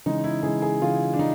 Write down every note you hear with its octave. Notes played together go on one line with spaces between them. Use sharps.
C#3 E3 G#3 D#4
E4
C#3 E3 G#3 G#4
G#4
C#3 E3 G#3 F4
D4
C#3 D#4